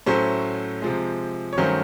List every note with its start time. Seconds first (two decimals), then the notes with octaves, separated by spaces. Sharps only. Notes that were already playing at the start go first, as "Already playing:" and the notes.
0.06 A2 F#3 A3 C#4 C5
0.82 C3 F3 G#3
1.53 C#5
1.57 G2 D#3 F#3 A3 C#4 C5